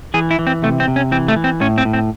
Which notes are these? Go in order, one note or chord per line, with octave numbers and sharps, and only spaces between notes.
E3 G#4
E4
E3
C4
C3 A3
C4
C3
C#4
E3 C4
A3
E3
C4
A2 C#4
C4
A2
C4